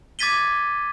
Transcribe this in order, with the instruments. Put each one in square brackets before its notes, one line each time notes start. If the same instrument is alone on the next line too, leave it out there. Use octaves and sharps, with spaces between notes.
[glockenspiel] D6 G#6 A6 B6 D#7 G7